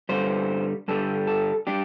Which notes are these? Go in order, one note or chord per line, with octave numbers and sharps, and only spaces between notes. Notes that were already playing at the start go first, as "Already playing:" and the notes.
G2 D3 G3 C5
G2 D3 G3 A4
A4
G3 D4 G4